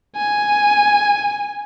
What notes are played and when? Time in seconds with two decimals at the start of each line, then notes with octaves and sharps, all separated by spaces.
0.16 G#5